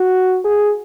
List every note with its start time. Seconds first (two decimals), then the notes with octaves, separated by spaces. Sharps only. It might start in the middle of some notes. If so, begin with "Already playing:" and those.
Already playing: F#4
0.44 G#4